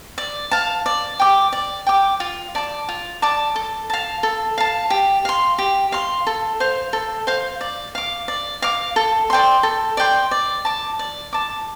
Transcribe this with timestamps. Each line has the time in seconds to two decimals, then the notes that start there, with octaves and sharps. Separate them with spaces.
0.18 D5
0.51 F5 A5
0.86 D5
1.20 G5 D6
1.53 D5
1.87 G5 D6
2.20 F4
2.55 D5 A5 D6
2.89 F4
3.22 D5 A5 D6
3.56 A4
3.90 F5 A5
4.23 A4
4.58 F5 A5
4.90 G4
5.25 F5 C6
5.58 G4
5.92 F5 C6
6.27 A4
6.60 C5 F5
6.93 A4
7.27 C5 F5
7.61 D5
7.95 F5 D6
8.28 D5
8.62 F5 D6
8.96 A4
9.30 D5 G5 C6
9.63 A4
9.97 D5 G5 C6
10.31 D5
10.65 A5 D6
10.99 D5
11.33 A5 D6